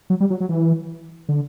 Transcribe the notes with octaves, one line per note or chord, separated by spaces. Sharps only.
F#3
G3
F#3
F#3
E3
D3